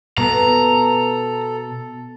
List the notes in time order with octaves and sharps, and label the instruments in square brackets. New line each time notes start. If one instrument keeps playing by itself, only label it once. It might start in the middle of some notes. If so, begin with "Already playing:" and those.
[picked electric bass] B2 [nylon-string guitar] B3 [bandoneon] A4 [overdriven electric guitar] A#5